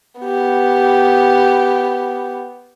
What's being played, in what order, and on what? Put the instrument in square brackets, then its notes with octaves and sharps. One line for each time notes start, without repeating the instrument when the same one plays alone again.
[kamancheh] B3 G4